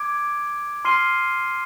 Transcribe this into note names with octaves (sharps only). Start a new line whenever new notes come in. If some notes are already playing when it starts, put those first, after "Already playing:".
Already playing: D6 G#6 D7
C6 F6 C7 D#7 G7